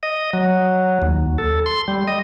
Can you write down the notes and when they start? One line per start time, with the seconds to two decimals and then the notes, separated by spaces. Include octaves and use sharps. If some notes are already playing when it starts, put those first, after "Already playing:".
0.03 D#5
0.33 F#3
1.02 D#2
1.38 A4
1.66 C6
1.88 G3
2.07 D#5